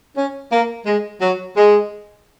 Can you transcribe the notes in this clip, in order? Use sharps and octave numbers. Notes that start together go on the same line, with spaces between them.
C#4
A#3
G#3
F#3
G#3